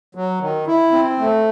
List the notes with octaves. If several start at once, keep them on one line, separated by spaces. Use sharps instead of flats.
F#3
D#3
E4
C4
A3